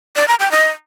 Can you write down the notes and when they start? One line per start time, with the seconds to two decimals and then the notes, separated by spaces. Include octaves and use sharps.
0.16 D5
0.28 A#5
0.40 G5
0.51 D#5